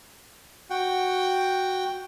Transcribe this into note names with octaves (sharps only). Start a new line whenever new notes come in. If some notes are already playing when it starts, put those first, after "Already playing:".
F#4 F#5 G5